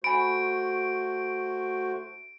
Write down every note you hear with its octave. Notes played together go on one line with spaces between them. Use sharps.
A3 F#4 C5 G#5 B5 D7